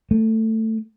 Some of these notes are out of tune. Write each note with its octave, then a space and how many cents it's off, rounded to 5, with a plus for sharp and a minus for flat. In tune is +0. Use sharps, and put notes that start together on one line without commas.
A3 +15